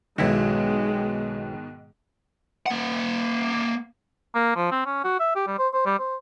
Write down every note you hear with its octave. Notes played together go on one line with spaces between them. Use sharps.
B1 G#2 B2 D#3 G#3 E4 F#4
A#3 F#5
A#3
F3
C4
C#4
F#4
E5
G4
G3
C5
C5
G3
C5